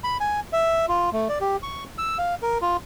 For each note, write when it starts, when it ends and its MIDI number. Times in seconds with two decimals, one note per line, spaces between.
0.04 0.18 83
0.20 0.40 80
0.53 0.86 76
0.88 1.10 65
1.13 1.28 57
1.29 1.39 74
1.41 1.56 67
1.63 1.84 85
1.98 2.18 88
2.18 2.35 77
2.42 2.58 70
2.62 2.77 65